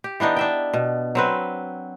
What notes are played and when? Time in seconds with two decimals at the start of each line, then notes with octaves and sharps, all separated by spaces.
0.04 G4
0.20 E3 B3 D4 D#4
0.37 D4 E5 G5
0.74 B2
1.15 F#3 C4 B4